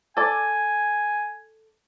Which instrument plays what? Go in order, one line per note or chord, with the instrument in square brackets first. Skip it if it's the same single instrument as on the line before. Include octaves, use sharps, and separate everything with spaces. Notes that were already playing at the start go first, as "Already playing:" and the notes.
[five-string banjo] A4 D5 [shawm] G#5